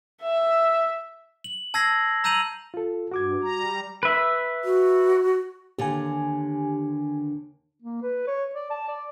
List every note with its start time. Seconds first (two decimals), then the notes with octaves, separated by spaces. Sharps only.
0.22 E5
1.44 F#7
1.74 A5 E6 G#6 A#6 C7
2.24 A#5 E6 G6 D#7 F7 F#7
2.74 F4 A4
3.12 G2 F#4 D6 G#6
3.42 G3 A#5
4.03 B4 E5
4.64 F#4
5.78 D#2 D3 G4 G#5
7.82 A#3
8.02 B4
8.27 C#5
8.55 D5
8.70 A5
8.88 D5